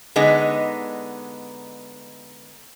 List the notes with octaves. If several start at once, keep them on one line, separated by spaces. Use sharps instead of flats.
D3 G#3 B3 D#4